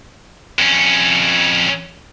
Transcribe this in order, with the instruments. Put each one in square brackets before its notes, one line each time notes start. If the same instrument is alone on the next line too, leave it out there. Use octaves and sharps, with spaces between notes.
[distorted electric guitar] F2 C#4